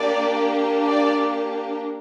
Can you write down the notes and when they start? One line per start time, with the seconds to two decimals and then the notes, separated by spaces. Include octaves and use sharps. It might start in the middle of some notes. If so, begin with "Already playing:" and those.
Already playing: A#3 D4 G4 D5
0.86 D5